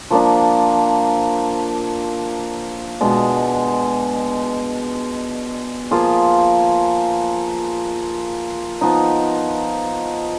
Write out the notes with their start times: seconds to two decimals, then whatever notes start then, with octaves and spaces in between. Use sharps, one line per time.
0.11 F3 A#3 D4
3.01 B2 G#3 D4
5.91 F3 A#3 F4 G#4
8.81 F3 B3 D#4